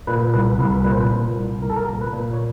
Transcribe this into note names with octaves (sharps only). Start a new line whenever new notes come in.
A#2 B4
C2 B4
C2 B4
A#2 B4
C5
B4
A#2
C2
C2 A#4
A4
A#4
A#2
B4
A#2
C#5